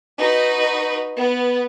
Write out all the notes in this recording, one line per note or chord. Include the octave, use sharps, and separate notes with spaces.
D#4 F#4 B4
B3